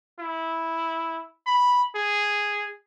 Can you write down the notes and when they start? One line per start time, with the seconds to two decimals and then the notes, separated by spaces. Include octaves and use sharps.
0.20 E4
1.46 B5
1.96 G#4